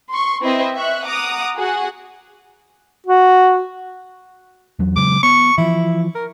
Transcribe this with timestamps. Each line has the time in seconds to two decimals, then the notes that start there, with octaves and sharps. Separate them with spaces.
0.11 C6 C#6
0.42 C4 E4 B4 D#5 E5 C6
0.75 E5 C#6 F#6
1.04 F#5 A#5 D6 D#6
1.55 F#4 G#4 F#5
3.07 F#4
4.79 E2 F#3
4.96 C#3 F#3 G#3 D6
5.23 B3 C#6
5.58 E3 F3 E4
6.15 A#4